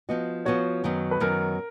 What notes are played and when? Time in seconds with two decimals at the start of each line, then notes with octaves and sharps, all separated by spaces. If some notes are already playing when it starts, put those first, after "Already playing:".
0.09 F3 B3 F#4 D#5
0.45 F3 B3 F#4 C#5
0.84 F#2 D#3 F#3 B3
1.11 B4
1.20 F#2 D#3 F#3 B3 A#4